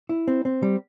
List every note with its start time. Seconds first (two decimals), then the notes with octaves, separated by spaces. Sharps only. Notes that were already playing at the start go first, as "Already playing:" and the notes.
0.09 E4
0.28 C4
0.45 C4
0.63 G3